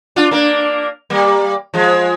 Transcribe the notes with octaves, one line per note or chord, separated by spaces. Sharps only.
D4 F4
A#3 D4
G3 A#3
F3 G#3